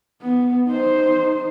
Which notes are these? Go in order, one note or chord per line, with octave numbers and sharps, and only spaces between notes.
B3
D#4 C5